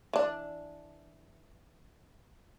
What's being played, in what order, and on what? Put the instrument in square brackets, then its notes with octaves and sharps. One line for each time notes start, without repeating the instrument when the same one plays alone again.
[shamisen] E3 D4